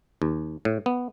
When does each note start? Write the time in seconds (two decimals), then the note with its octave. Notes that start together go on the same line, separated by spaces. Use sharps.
0.22 D#2
0.65 A2
0.86 B3